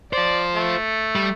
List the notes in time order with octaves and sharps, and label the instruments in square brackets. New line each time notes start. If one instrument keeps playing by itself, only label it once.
[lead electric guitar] F4 C5 [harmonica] D5
[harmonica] A3
[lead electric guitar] G3